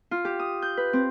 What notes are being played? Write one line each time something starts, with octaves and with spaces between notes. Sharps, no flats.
F4
G4
D#6
G6
B4
C4